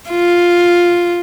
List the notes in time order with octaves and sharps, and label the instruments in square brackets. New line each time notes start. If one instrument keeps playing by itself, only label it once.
[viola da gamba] F4